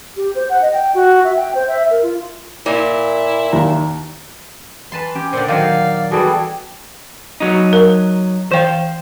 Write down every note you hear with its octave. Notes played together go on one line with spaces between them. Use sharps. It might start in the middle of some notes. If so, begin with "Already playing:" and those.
G4
C5
F#5
D#5
G5
F#4
E5
G5
C5
E5
A#4
F4
A#2 E4
D#2 A#5
E3 B4 A5 C6
C#4 G4
A#2 D3 C5
D#3 F#3 G#4 D5 F5
E3 G3 B3 F#4 G#4 A4
F#3 D#4
A#4
E3 C5 F5 G5